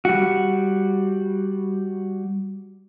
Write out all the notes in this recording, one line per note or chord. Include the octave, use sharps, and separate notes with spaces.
G3 F#4